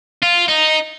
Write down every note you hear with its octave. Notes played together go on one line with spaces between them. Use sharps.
F4
D#4